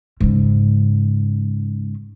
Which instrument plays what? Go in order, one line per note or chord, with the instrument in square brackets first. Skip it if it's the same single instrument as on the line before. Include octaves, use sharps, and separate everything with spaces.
[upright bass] G#2 C#3